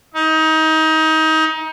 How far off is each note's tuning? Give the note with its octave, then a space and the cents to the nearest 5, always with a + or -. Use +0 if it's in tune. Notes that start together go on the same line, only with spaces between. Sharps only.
D#4 +25